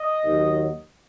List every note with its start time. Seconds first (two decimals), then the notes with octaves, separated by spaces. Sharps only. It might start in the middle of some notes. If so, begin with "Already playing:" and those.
Already playing: D#5
0.24 D#2 D#3 F#3